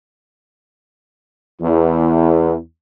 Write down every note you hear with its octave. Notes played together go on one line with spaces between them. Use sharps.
E2